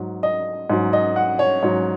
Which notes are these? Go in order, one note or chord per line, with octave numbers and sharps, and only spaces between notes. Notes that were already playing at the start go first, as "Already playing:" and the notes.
Already playing: G#2 F#3
D#5
G#2 F#3
D#5
F#5
C#5
G#2 F#3 C#5